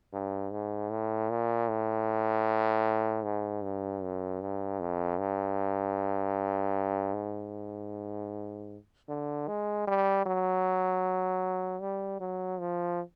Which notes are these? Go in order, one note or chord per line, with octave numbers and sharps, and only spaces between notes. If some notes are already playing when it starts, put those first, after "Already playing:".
G2
G#2
A2
A#2
A2
G#2
G2
F#2
G2
F2
G2
G#2
D3
G#3
G3
F#3
G3
F#3
F3